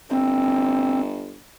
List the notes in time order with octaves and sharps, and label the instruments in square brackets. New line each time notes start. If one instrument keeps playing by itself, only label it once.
[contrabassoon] G1 [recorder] C4